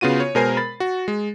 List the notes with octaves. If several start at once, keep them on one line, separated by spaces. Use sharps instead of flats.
C#3 B3 F4 F#4 D#7
C#5
B2 G#3 A#4 C5 G#5 C7
B5 A6
F#4
G#3